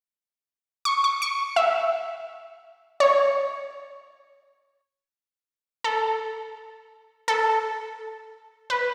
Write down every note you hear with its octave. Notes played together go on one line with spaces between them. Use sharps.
C#6
C#6
C#6
E5
C#5
A4
A4
B4